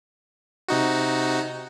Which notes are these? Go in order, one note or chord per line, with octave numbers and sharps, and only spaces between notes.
C3 D#4 F#4